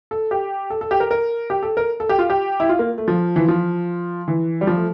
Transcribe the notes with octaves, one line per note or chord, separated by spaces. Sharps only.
A4
G4
A4
A4
G4
A#4
A#4
G4
A4
A#4
A4
G4
F4
G4
E4
F4
A#3
A3
F3
E3
F3
E3
G3
F3
A3